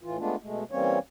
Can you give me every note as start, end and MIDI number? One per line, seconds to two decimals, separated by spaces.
0.03 0.18 45
0.03 0.18 52
0.03 0.18 65
0.18 0.36 56
0.18 0.36 57
0.18 0.36 59
0.18 0.36 62
0.18 0.36 65
0.43 0.64 47
0.43 0.64 56
0.43 0.64 57
0.71 0.99 52
0.71 0.99 55
0.71 0.99 58
0.71 0.99 60
0.71 0.99 61
0.71 0.99 73